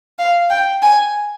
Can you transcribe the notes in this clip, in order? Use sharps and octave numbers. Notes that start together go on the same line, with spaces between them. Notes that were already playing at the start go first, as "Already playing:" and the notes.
F5
G5
G#5